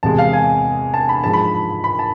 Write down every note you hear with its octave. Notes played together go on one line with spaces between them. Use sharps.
E2 C3 G#3 A5
F5
G#5
A5
B5
G#2 F3 G#3 A5
B5
B5
A5